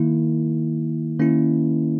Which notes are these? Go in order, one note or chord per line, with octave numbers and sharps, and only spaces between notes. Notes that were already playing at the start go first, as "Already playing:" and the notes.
Already playing: D#3 A#3 E4
D#3 A#3 C#4 E4